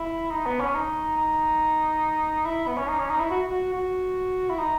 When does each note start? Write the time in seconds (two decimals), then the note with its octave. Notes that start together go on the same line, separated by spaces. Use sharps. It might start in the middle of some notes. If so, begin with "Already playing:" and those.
Already playing: E4
0.31 D#4
0.46 B3
0.60 C#4
0.74 D#4
1.17 D#4
2.45 E4
2.67 B3
2.78 C#4
2.88 D#4
2.99 C#4
3.10 D#4
3.20 E4
3.31 F#4
3.50 F#4
3.73 F#4
4.50 E4
4.59 D#4